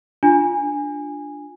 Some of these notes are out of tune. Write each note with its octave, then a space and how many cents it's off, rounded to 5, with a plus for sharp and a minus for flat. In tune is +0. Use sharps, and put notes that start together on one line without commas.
D4 +0 F4 +0 G#5 -10